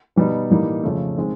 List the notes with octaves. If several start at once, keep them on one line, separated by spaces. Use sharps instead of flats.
B2 G3 B3 D#4
A2 E3 G3 A#3 D#4
F2 C#3 F3 A3
D#3 G#3 C4